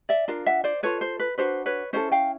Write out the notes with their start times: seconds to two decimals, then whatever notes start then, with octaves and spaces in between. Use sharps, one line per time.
0.09 D5 E5
0.28 D4 F4 A#4
0.46 E5 F#5
0.64 C5 D5
0.83 F4 A4 B4 C#5
1.01 C5
1.19 B4
1.38 D4 F#4 B4 C5
1.66 B4 C#5
1.93 C#4 E4 A4 C5 D5
2.12 F5 G5